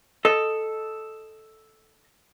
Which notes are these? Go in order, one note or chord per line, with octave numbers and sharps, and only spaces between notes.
A4 D#5